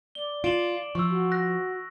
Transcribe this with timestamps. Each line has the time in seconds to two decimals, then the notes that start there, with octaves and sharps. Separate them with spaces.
0.15 D5 G7
0.44 F4 D7 E7 F#7
0.95 F3 C#6 E6
1.10 F#4
1.31 F#6 A#6